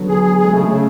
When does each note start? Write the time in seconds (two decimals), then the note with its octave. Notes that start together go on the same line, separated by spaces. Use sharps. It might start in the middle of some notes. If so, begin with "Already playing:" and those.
Already playing: D3 F#3 B3
0.09 G#4
0.24 G#4
0.37 G#3 G#4
0.52 C#3 A3
0.67 C#3